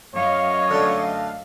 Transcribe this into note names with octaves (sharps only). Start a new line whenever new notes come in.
F#2 C#5 D#5 F5
D3 A3